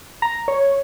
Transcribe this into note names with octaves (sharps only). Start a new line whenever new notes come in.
A#5
C#5